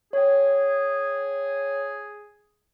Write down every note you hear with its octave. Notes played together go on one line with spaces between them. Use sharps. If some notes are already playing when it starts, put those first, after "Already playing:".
G#4 C#5 G5